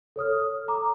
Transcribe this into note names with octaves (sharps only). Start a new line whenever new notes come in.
A4 C#5 D#6 F6
A#5 D6